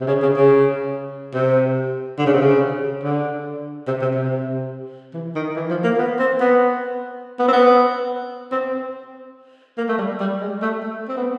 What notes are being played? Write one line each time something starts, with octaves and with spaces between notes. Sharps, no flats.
C3
C#3
C#3
C#3
C3
D3
C#3
C3
C#3
D3
C3
C3
C3
E3
D#3
E3
F3
A#3
B3
C4
B3
B3
C4
B3
C4
A#3
A3
G3
G3
G#3
A3
A3
C4
B3